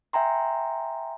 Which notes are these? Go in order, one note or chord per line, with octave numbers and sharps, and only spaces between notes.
E5 G5 G#5 A#5 C6